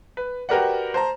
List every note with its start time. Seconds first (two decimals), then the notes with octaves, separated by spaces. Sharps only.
0.17 B4
0.49 F#4 G4 A#4 B4 D5 F#5
0.94 C5 A5 A#5